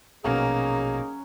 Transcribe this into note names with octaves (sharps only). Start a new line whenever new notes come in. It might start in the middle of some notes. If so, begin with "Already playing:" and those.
A#1 B2 F#3 A#3 C#4 D#4 G#4